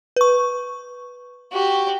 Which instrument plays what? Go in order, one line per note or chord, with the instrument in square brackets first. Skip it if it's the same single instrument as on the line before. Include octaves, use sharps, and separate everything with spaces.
[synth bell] B4 C#6
[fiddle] F#4 G4